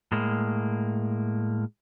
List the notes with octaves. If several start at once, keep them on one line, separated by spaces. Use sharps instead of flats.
A2 G#3 A#3